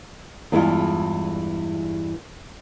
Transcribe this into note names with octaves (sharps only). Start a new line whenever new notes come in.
E2 G2 E3 G#3 D4 F4